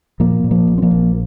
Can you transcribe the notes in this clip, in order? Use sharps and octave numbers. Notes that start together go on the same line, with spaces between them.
A#2 F3 A#3
A#2
F3 A#3
A#1
C4
F3 A#3
A#1